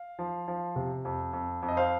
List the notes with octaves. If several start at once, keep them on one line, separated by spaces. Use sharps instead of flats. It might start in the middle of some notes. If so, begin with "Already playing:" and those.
Already playing: F5
F3
F3
C3
F2
F2
F2
D#5
C5 F5